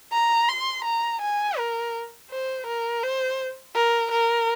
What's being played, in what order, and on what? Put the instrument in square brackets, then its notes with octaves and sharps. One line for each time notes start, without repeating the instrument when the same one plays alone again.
[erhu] A#5
C6
A#5
G#5
A#4
C5
A#4
C5
A#4
A#4